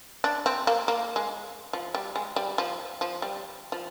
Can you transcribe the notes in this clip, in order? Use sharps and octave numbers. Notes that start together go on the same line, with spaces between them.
D4
C4
A#3
A#3
G#3
F3
G3
G#3
G3
F3
F3
G3
F3